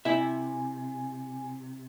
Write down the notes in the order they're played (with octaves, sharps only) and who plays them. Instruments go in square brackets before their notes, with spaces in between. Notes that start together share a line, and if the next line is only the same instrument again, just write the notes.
[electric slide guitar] C3 [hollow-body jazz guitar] E4 E5 [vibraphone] G#5